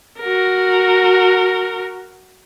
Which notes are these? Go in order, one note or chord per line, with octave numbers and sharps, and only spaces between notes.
F#4 A#4